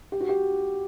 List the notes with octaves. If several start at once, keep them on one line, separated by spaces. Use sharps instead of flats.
G4
F#4
G4